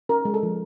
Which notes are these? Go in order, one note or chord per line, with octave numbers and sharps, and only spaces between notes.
C#4 A#4
G#3
A4
F3